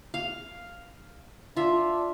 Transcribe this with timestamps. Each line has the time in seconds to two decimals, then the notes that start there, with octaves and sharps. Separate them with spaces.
0.14 F5
1.56 D4 F4 E5